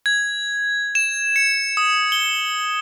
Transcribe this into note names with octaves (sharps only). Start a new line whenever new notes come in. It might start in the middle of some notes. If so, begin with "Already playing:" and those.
G#6
E7
C#7
D#6
G7